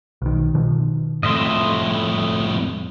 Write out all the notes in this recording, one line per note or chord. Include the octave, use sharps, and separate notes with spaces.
B1 D#3
B2 D#3 F3
F2 A2 D#5 E5 C6